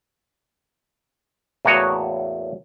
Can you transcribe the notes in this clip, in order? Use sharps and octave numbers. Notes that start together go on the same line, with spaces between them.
E2 A2 A#3 F#4 C#5 D#5